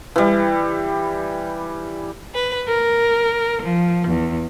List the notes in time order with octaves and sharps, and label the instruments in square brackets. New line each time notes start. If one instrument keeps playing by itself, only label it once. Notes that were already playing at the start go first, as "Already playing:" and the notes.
[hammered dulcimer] E3 G3
[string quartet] B4
A#4
F3
E2